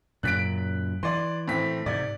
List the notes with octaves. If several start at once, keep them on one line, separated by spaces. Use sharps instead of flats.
F#2 A#2 C#3 F#6 B6 D7
E3 D5 C6
A2 C4 B6
G#2 C3 D5